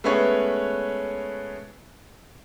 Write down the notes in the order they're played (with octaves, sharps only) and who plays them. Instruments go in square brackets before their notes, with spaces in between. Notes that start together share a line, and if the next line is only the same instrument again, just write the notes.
[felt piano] G#3 A3 B3 C#4 B4 C#5